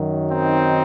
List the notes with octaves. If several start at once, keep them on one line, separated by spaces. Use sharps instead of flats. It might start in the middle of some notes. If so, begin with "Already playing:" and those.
Already playing: F#2 D#3 F#3
C4 D#4